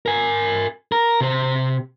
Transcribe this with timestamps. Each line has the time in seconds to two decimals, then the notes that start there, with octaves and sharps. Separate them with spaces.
0.06 A#4 G#5
0.92 A#4
1.21 C3 C5